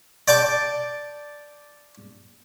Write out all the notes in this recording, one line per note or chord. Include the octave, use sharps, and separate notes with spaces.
D5 G5 A5 D6